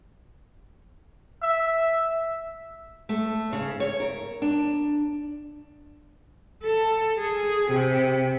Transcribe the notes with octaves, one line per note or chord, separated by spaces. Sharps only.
E5
A3
C#3
C#5
A#4
D4
A4
G#4
C3